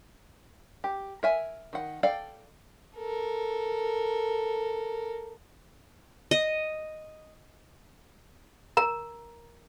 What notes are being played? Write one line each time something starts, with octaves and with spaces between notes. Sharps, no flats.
G4
A#4 E5 G#5
D#3 F#5
A4 D5 F5 G5
A4 A#4
D#5
A#4 A#5